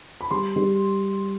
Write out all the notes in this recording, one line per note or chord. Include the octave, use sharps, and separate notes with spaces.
B5
G3 C6
G3